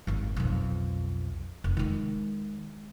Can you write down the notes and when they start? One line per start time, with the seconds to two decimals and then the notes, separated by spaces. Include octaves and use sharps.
0.07 G#1 D#2
0.36 B1 F2
1.64 F1
1.77 D#3 G#3